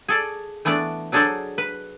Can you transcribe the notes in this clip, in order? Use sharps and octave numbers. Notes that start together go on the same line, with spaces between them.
G#4 A4 D5
E3 A3 B3 D4 D5
F#3 D4 G#4 A4 C5 D5
B4